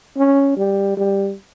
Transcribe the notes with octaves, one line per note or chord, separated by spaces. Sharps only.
C#4
G3
G3